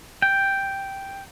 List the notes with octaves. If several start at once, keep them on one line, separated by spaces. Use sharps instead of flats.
G5